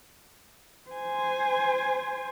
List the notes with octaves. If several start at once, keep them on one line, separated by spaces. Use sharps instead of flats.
C5 G#5